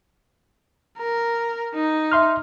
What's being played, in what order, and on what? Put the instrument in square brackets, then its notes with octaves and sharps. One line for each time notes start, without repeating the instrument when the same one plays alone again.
[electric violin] A#4
D#4
[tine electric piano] E5 C6 F6